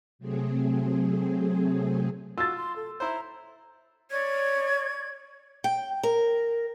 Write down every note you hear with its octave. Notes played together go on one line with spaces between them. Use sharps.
C3 F#3 A3 C4 G#4
F4 F#4 E6 A6
C6
A4
E4 C5 A#5
C#5 D5 C#6 G#6
G5
A#4